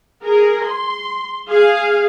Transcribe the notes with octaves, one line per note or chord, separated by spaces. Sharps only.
G#4 A#4
C6
G#4 F5